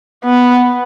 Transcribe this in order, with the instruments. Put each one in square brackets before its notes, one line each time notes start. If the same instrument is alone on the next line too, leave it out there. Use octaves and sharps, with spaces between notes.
[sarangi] B3